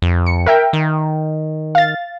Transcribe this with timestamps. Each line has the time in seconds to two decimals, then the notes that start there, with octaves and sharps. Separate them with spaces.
0.02 F2
0.26 C#7
0.46 A#4 E5 G5
0.73 D#3
1.75 F5 A6